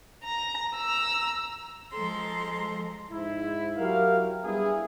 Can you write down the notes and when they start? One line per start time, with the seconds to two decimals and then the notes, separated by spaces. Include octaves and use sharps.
0.24 A#5
0.74 A#5 E6
1.93 F3 G#3 A4 A#5 C6
3.10 G#2 E4
3.78 F#3 E4 F#4 G4 A#4 F5
4.44 G3 B3 D4 E4 G#4